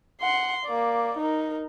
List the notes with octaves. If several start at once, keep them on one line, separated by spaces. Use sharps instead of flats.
F#5 C6
A#3 D5
D#4 A#4